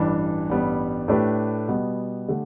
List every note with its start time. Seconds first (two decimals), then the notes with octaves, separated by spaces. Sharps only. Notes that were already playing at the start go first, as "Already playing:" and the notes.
Already playing: A1 G2 E3 G3 D4
0.49 A1 G2 G3 B3
1.08 A2 A3 D4 G4 B4
1.68 B2 G3 B3
2.28 D3 A3 G4